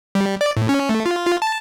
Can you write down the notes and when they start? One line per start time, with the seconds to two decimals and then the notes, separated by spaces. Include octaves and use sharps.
0.15 G3
0.41 D5
0.57 A2
0.69 C#4
0.89 A3
1.06 F4
1.26 F4
1.42 A5